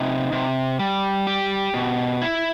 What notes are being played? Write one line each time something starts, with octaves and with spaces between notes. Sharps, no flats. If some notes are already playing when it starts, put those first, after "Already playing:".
Already playing: C3 D#4
C3
G3
G4
B2
E4